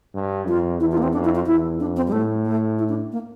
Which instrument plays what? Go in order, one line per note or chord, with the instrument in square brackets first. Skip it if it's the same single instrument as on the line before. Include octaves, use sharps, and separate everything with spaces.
[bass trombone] G2
[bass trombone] F2 [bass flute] F4
[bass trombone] E2 [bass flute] E4
[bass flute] F4
A#3
C4
[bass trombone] F2 [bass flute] D4
[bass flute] E4
F4
[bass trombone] E2 [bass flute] E4
[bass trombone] F2 [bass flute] D4
[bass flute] C4
G3
[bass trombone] A2 [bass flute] A3
[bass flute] A3
E4
D4
A#3